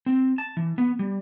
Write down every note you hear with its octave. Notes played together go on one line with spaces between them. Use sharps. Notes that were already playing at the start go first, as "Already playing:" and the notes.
C4
A5
E3
B3
G3